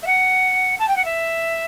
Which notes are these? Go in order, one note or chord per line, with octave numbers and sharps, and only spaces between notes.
E5
F#5
A5
G5
F#5
E5